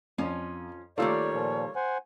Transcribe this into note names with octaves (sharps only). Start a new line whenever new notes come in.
F2 F3 C#4
D#3 G3 A3 A#3 F4 C#5 D5 E6
A#2 F3
C5 F#5 G#5